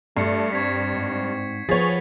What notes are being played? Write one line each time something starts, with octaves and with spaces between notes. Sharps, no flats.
G2 A3 C7 C#7
C4 C#6 G#6 B6
G#2
F3 B3 G#4 C#5 A6 B6